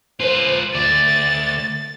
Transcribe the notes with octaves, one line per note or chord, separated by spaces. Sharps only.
F4 B4 C5
D2 D5 A6